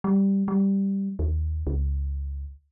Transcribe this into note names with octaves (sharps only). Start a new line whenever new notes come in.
G3
G3
D#2
C#2